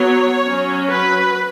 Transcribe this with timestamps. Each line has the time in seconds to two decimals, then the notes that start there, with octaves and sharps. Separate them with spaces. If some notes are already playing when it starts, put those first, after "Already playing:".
Already playing: F#3 B3 C#5
0.47 F#3 C#4
0.90 B4